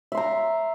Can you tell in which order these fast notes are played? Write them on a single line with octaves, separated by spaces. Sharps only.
E5 C6 A#5